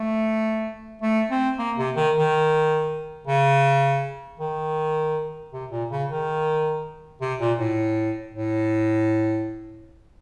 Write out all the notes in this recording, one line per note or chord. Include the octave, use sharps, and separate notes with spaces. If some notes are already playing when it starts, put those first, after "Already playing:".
Already playing: A3
A3
C4
A#3
C3
D#3
D#3
C#3
D#3
C3
A#2
C#3
D#3
C3
A#2
A2
A2